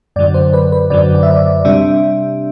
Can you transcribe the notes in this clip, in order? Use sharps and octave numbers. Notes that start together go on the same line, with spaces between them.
F#2 D3 F#3 D5
C5
B4
B4
F#2 D3 F#3 D5
D5
E5
D5
C3 G3 D4 E5